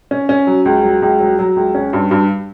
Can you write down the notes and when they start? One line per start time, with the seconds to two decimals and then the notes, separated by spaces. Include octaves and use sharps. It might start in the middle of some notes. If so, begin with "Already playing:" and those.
0.11 C#4
0.29 C#4
0.47 F#3
0.65 C#2
0.83 F#3
1.02 C#2
1.20 F#3
1.39 F#3
1.56 C#2
1.75 C#4
1.93 G2
2.11 G2